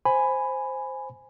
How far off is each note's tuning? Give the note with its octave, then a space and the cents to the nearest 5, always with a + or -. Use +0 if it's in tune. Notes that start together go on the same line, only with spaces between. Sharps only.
C5 +0 G#5 +0 B5 +10